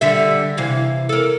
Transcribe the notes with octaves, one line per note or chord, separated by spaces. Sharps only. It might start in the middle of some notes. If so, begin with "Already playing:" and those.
D3 G3 E5
C3 E3 F5
A4 A#4